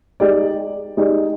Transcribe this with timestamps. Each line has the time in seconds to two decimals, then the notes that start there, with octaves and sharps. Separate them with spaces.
0.20 G#3 D#4 G4 D5
0.97 G#3 D#4 G4 D5